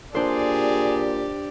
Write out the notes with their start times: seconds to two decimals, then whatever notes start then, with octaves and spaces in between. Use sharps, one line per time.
0.15 A#2 D4 G4 G#4 C5 D5